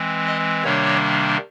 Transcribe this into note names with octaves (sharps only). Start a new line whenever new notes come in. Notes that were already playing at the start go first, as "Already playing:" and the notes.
Already playing: E3 G#3 C4
D#5
C3 D#3 G3 A#3 D4 C#5